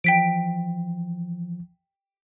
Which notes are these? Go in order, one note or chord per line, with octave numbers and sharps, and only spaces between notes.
E3 F3 G5 B6 D7